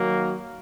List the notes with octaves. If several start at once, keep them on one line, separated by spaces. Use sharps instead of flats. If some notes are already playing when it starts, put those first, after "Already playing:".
Already playing: D#3 F#3 A#3